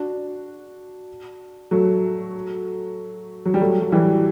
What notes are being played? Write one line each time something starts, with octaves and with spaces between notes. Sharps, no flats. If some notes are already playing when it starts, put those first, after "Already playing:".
Already playing: D4 F#4
F#3 A3
F#3
G3
F#3 A3
F#3
E3 G3